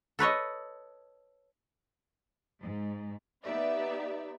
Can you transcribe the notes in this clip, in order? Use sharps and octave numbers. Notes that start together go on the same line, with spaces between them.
A4 B4 C#5 D#5
G#2
B3 D#4 G4 D5 E5